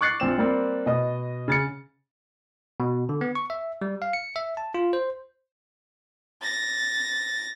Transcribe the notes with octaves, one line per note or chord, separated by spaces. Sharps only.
C#6 D6 F#6 A6 C7 C#7
A#1 C4 E7
G3 A#3 C4
B2 D#5 D#6
C#3 A6 C#7
B2
D3
B3
C#6
E5
G3
F5
C#7
E5
A5
F4
C5
A6 A#6